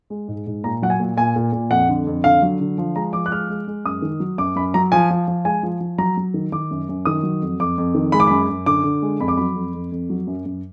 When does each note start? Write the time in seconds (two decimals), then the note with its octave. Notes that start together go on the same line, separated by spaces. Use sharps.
0.10 G#3
0.28 G#2
0.47 G#2
0.64 A#2 A#5
0.82 F#3 F#5
0.90 G#5
1.00 A#2
1.17 A#2 G#5
1.36 A#2
1.52 A#2
1.70 F2 F#5
1.89 D3
2.07 F2
2.24 D3 F5
2.42 F#3
2.60 D3
2.78 F3
2.96 G#3 A#5
3.13 F3 D6
3.26 F#6
3.31 G#3 F6
3.49 G#3
3.67 G#3
3.85 F#2 D#6
4.02 D#3
4.20 F#3
4.38 F#2 D6
4.56 F#2 B5
4.74 F#3 A#5
4.92 F3 G#5
5.10 F3
5.28 F3
5.45 G#3 G#5
5.63 F3
5.80 F3
5.98 F#3 A#5
6.17 F#3
6.34 D#3
6.52 D#3 D6
6.71 F#2
6.89 F#2
7.05 D#3 D#6
7.23 F#3
7.42 F2
7.60 F2 D6
7.78 F2
7.94 D#3
8.12 G#3 B5
8.20 D6
8.27 F#2 B5
8.49 F#2
8.66 D3 D6
8.84 D3
9.02 G#3
9.20 F2 B5
9.28 D6
9.37 F#3 B5
9.55 F2
9.74 F2
9.92 F2
10.10 F#3
10.27 F#2
10.45 F#2